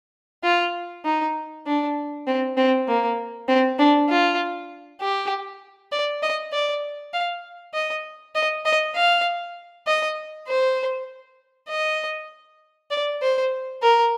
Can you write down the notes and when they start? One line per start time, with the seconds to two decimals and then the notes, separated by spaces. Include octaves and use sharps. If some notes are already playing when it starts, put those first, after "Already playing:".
0.44 F4
1.05 D#4
1.67 D4
2.27 C4
2.57 C4
2.88 A#3
3.48 C4
3.79 D4
4.09 F4
5.01 G4
5.92 D5
6.23 D#5
6.53 D5
7.13 F5
7.74 D#5
8.35 D#5
8.65 D#5
8.96 F5
9.87 D#5
10.48 C5
11.69 D#5
12.91 D5
13.22 C5
13.83 A#4